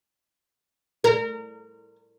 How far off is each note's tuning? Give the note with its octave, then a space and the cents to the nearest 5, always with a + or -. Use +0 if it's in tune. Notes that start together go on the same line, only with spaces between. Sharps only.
A#4 -30